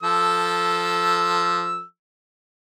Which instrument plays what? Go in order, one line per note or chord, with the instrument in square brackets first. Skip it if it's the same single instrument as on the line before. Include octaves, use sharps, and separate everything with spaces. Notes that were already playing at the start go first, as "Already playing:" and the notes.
[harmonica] F3 A4 E6